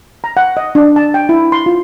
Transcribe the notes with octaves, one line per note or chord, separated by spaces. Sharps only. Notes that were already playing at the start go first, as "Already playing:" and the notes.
A#5
F#5
D#5
D4
A5
G5
E4
C6
F4